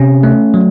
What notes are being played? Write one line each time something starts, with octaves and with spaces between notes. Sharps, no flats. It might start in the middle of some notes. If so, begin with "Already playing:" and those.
Already playing: C3 C#4
A3
F#3